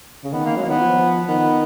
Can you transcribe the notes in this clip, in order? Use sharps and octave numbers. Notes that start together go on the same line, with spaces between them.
C#3
D#3 B3
A#3
F#3 G#3
A#3
D#3 B3
F3
D#3 B3